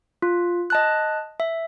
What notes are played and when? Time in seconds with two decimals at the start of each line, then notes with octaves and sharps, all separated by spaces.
0.22 F4
0.70 D#5 A5 F#6
1.40 E5